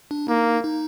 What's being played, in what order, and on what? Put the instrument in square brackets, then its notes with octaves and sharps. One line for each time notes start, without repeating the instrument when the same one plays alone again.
[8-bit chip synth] D4
[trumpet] A#3 [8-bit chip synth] D#4
[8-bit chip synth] D#4